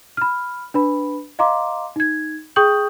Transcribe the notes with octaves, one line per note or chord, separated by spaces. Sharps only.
B5 F6
D4 B4 B5
D#5 F5 A#5 C6 D6
D#4 G#6
G#4 G5 C#6 D#6 G6 F#7